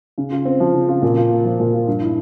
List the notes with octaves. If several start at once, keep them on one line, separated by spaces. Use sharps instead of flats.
C#3
F4
C4
F3
C#3
F4
A#2
F4
A#3
F3
A#2
F4
G2
E4